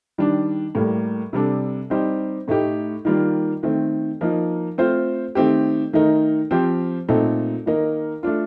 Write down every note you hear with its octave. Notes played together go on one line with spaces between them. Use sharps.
D#3 G3 D4
A2 G3 A#3
C3 G3 D4 A4
G3 C4 D#4 G4 C5
A2 A3 D#4 G4
D#3 G3 A#3 F4
D#3 A3 C4
F3 A#3 D#4
A3 C4 F4 C5
D#3 A3 C4 G4
D#3 A3 D#4 A#4
F3 C4 G4 C5
A#2 A3 C4 D#4 A4
D#3 A#3 D#4 A#4
A3 D4 F4